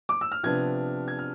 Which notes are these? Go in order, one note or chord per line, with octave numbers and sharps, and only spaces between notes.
D6
E6
F6
C3 F3 B3 D4 G#6
G#6
F6